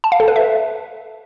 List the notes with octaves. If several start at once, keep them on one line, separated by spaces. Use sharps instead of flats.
A5
F5
A4
B4
E5